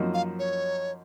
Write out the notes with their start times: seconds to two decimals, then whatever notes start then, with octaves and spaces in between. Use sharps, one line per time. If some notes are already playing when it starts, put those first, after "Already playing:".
Already playing: F#2 F3 A#3 D#4
0.14 F5
0.39 C#5